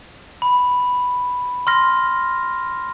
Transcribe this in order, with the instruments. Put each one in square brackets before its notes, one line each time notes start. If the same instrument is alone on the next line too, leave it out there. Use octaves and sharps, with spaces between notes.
[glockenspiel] B5
C6 F6 A#6